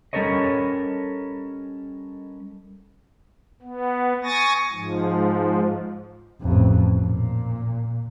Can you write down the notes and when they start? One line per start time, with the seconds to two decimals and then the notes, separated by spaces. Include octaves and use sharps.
0.13 G3 C#4 A4 A#4 C#5 D#5
3.62 B3
4.24 G#5 C#6 D#6 A6 A#6
4.72 G#2 F3
6.41 A1 F2
6.97 A#2